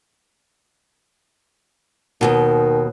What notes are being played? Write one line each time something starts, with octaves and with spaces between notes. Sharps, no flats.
D#2 G#2 B2 D#3